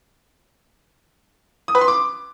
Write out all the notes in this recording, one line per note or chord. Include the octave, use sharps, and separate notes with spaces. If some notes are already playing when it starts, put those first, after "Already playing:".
D#6
B4
C6
D6